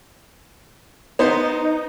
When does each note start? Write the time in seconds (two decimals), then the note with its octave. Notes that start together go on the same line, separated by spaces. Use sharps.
1.19 B3 D#4 C5